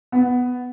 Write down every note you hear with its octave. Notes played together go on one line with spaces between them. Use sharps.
B3